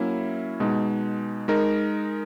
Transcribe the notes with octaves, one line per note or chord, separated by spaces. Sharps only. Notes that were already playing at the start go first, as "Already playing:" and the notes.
Already playing: F#3 A#3 C#4 E4
B2 G#3 D#4
G#3 D#4 A#4